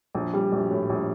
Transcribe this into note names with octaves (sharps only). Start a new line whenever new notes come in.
A#1
G3
A#1
A2
A#1